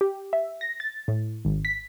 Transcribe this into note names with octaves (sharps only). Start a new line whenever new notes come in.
G4
E5
A#6
A6
A2
G#1
B6